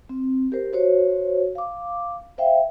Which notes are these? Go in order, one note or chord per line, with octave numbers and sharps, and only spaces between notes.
C4
G4 A#4 C5
F#4 C5 C#5
F5 D6
C5 E5 F5 G5